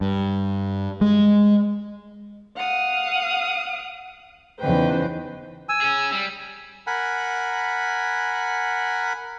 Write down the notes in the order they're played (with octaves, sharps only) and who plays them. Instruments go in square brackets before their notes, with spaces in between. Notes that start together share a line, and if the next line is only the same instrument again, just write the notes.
[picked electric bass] G2
G#3
[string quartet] F5 F#5 D#6
E2 C#3 D#4 B4 C5 G5
[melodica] G#5 E6
[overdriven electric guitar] C#4 G#4
G3
[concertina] A#4 F#5 G#5 B5